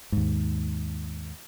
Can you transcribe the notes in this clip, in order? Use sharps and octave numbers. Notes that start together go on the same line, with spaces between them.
D#2 G#2